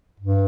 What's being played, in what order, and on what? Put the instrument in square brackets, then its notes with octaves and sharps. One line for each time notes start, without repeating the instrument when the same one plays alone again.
[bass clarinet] G2